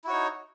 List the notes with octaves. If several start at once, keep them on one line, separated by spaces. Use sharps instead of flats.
D#4 E4 F#4 C#5